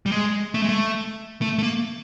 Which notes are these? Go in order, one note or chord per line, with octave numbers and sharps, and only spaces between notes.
G3
G#3
A3
G#3
A3
A3
A3
A#3